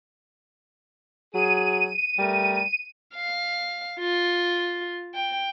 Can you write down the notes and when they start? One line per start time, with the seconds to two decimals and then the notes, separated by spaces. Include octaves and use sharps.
1.34 F#3 G#4 D#7
2.19 G3 A3 A#4
3.15 F5
4.00 F4
5.15 G5